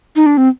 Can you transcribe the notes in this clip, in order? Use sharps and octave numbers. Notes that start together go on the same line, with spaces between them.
D#4
D4
C4